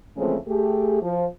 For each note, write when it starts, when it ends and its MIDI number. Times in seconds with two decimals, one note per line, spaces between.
0.17 0.36 49
0.17 0.36 52
0.17 0.36 53
0.17 0.36 56
0.17 0.36 57
0.17 0.36 60
0.48 0.98 57
0.48 0.98 67
0.48 0.98 68
1.02 1.25 53